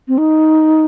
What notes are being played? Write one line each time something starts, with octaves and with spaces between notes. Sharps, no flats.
C4
D#4